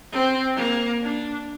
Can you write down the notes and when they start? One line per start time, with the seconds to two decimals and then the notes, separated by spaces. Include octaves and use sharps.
0.12 C4
0.57 A#3
1.02 D4